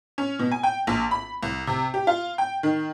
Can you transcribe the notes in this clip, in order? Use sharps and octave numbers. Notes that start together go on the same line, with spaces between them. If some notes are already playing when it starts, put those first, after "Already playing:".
C#4
B2
G#5
G5
A#1
B5
C2
C3
G4
F4
G5
D#3